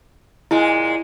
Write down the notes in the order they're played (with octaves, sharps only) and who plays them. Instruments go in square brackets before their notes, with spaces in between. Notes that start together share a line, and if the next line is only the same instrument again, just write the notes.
[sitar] A#2 G#3 [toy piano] E4